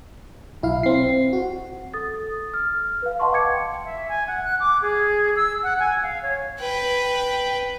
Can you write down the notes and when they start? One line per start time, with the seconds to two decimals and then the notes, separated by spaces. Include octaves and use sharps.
0.63 B1 E4 F5
0.83 C4 C7
1.33 F#4
1.94 A4 D#6 A6
2.54 F6
3.02 B4 F5
3.20 D#5 F5 F#5 A5 C6 C#6
3.33 G5 D6 G#6 C#7
3.85 E5
4.08 G#5
4.27 F#5
4.45 F#6
4.60 D6
4.82 G#4
5.36 E6
5.63 F#5
5.79 G#5
6.03 F5
6.23 C#5
6.60 B4 G5